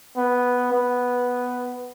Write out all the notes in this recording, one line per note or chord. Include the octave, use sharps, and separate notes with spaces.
B3
B3